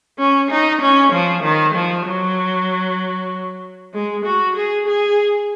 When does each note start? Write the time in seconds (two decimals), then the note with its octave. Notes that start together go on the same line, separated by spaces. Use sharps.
0.19 C#4
0.50 D#4
0.81 C#4
1.12 F3
1.43 D#3
1.74 F3
2.06 F#3
3.94 G#3
4.25 F#4
4.56 G#4
4.87 G#4